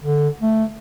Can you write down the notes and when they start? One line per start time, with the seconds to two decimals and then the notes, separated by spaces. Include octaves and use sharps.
0.04 D3
0.41 A3